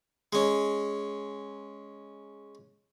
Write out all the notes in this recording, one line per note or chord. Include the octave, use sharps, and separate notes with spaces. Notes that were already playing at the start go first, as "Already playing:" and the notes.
G#3 C#4